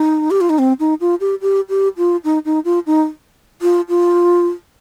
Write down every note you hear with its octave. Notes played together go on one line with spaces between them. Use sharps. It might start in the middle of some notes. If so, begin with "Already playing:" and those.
Already playing: D#4
G4
F4
D#4
C4
D#4
F4
G4
G4
G4
F4
D#4
D#4
F4
D#4
F4
F4